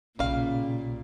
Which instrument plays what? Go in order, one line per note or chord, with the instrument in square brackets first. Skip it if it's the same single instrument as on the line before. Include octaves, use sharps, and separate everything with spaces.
[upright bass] B1 [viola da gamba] A#2 [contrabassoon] C#3 [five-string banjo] G3 F5